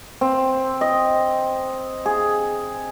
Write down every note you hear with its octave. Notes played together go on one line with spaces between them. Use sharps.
C4
D#5
G#4